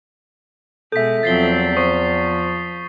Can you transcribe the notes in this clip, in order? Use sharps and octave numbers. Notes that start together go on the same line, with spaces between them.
B2 G#3 A4 E5 G6 B6
E2 F3 F#3 C4 A6 C7 G7
F3 C5 C#6 D#6 C7